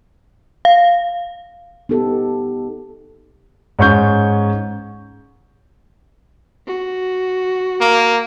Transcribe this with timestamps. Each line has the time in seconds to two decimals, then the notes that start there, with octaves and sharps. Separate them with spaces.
0.65 F5
1.89 B3 D#4 G4 A4
3.79 G#2 C#4 C#6 G6
6.67 F#4
7.81 A#3